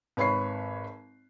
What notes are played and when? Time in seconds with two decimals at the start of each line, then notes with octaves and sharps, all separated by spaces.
0.17 G#1 B4 C#5 B5 C#6 C7